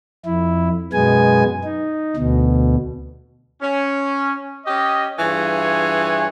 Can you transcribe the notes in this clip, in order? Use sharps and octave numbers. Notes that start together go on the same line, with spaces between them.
F2 E4
F#2 B2 G#3 B3 G#5
D#4
D2 B2
C#4
C#4 G4 D#5
G2 E3 F4 G#4 C#5